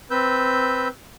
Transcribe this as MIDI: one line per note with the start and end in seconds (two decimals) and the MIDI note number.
0.11 0.88 60
0.11 0.88 71
0.11 0.88 88
0.11 0.88 91